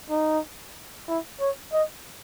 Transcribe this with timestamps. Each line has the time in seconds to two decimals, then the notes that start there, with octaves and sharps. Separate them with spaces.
0.10 D#4
1.08 E4
1.40 C#5
1.73 D#5